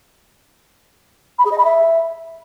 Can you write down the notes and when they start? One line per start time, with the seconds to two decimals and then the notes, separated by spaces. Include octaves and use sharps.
1.38 B5
1.45 G#4
1.51 D#5
1.58 B5
1.64 E5